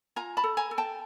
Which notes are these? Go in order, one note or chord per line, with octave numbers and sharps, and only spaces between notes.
F4 G#5 A#5
A5 B5
A4
G#5 A#5
A4
G5 A5